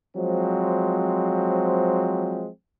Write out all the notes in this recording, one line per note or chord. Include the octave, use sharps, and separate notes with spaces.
F3 F#3 G#3 C4